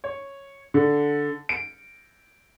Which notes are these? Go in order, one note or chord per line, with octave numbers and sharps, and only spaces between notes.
C#5
D3
D7